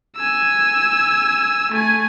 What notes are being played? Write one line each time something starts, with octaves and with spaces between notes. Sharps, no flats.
G#5 E6
A3 G#5